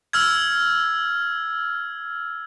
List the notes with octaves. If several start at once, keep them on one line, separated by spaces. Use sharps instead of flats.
E6 F6 G#6